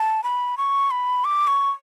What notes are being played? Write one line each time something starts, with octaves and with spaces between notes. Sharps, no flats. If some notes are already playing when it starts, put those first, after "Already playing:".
Already playing: A5
B5
C#6
B5
D6
C#6